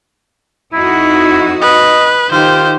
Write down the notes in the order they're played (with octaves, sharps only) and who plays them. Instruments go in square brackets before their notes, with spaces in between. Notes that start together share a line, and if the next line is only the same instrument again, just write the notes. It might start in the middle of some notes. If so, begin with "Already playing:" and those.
[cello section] F2 D#4 F#4 [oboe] E4
[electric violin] B4 [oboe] D#5
[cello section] D#3 [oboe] F4 [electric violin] G4 C5